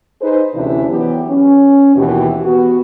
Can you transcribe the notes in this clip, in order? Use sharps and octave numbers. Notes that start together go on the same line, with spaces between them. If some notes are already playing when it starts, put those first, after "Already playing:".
D#4 G#4 B4 C5
D2 C3 E3 C#4 D4 E4
E3 F#3 B3 G4
C#4
D#2 B2 E3 F#4 G4
B3 F#4